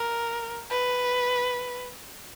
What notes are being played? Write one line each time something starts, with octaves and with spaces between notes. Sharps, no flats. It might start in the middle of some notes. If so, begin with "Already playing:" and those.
Already playing: A#4
B4